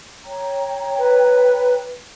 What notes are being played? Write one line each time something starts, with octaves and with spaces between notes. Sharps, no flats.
C#5 G5 A#5
B4